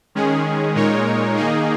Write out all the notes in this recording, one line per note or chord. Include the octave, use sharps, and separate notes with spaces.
D#3 G#3 C#4 G#4
A#2 G#3 D#4 A#4 C#5
D#3 A#3 D#4 G#4